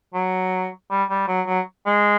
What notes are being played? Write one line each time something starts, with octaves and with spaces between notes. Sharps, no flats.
F#3
G3
G3
F#3
F#3
G#3